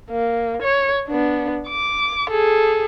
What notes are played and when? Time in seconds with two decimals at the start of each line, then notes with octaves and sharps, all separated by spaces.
0.10 A#3
0.62 C#5
1.08 B3 D4
1.68 D6
2.30 G#4 A4